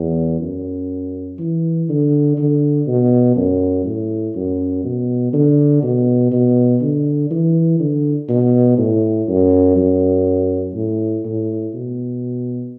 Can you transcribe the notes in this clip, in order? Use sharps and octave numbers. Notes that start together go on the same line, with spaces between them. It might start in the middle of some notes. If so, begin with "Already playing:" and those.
Already playing: E2
F#2
E3
D3
D3
B2
F#2
A2
F#2
B2
D3
B2
B2
D3
E3
D3
B2
A2
F#2
F#2
A2
A2
B2